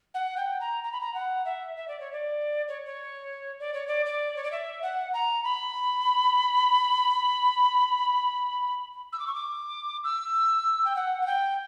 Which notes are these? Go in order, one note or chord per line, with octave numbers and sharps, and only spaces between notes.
F#5
G5
A#5
A#5
B5
A#5
F#5
E5
E5
D5
C#5
D5
C#5
C#5
D5
C#5
D5
D5
C#5
D5
E5
F#5
A#5
B5
E6
D6
C#6
D6
E6
G5
F#5
F#5
G5